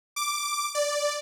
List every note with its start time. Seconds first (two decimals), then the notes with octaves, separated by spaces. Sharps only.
0.16 D6
0.75 D5